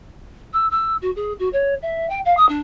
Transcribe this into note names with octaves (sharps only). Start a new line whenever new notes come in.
E6
E6
F#4
G#4
F#4
C#5
E5
G5
F5
D#6
D4